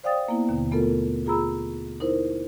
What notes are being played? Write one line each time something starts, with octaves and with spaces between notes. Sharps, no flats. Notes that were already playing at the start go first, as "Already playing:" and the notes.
C5 D5 F5 G5 D#6 A6
A#3 B3 E4
D#2 B2 D3
A3 B3 F4 A4 A#4
F4 G#4 A#5 B5 E6
D#4 E4 A#4 C5